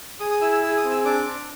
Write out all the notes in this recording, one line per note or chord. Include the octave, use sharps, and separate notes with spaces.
G#4 D#6
D#6
E4 E6
E6
G#4 E6
D#6
C4
E6
D4 D6
D4